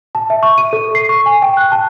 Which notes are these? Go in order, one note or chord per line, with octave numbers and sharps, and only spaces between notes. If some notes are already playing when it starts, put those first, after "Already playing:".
A5
E5
C#6
D#7
A4
C7
C#6
G#5
G5
F#6
A5